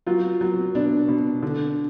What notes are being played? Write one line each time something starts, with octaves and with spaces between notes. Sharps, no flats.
F#3 F4
F#3
B2 D4
B2
D3